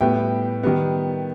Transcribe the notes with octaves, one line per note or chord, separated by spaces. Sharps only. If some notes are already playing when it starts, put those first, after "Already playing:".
A2 G3 B3 G5
D#3 G3 B3